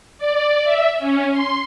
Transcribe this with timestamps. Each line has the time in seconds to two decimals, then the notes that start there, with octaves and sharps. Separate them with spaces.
0.18 D5
0.64 E5
0.99 C#4
1.31 C6